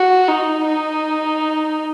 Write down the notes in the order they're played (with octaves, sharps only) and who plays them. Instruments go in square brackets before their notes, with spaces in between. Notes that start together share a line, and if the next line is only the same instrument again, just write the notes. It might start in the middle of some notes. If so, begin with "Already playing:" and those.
Already playing: [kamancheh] F#4
D#4
D#4